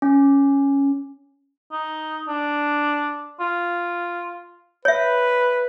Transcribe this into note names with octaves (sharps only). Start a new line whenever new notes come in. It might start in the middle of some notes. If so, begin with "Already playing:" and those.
C#4
D#4
D4
F4
B4 C#5 E5